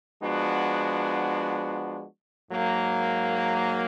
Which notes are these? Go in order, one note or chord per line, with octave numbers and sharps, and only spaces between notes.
F3 G#3 B3 D4 F#4
G#2 F#3 A#3